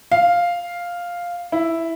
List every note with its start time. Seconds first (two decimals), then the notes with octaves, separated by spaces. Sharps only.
0.12 F5
1.52 E4